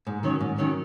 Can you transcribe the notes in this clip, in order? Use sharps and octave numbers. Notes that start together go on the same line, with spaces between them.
G#2
D#3 F#3 C#4
G#2
D#3 F#3 C#4